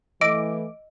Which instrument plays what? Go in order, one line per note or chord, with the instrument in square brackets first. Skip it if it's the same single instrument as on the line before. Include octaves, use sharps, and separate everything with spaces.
[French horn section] E3 A3 [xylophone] D#5 E6 A#6 [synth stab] D6